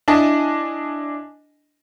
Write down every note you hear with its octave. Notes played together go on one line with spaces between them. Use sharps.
D4 E4 D#5 G#5 A5